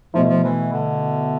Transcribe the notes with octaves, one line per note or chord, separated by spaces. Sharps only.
B2 F3 A3 E4
F3
E3
D3